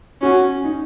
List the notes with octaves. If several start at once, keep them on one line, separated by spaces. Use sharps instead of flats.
C#4 F#4
D#4